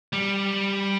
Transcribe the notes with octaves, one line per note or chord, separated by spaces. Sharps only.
G3